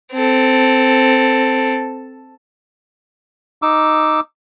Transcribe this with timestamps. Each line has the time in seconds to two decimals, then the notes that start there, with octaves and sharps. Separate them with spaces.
0.13 C4 A4
3.62 D#4 D6 E6